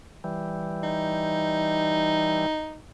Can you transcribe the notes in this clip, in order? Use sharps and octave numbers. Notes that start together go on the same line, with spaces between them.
E3 G3
D#4